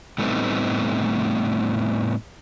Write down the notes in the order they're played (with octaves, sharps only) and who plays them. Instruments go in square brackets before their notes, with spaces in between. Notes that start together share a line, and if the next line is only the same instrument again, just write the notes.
[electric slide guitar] A2 G3 A3 B3 C4 D#4